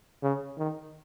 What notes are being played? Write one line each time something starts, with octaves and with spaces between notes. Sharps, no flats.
C#3
D#3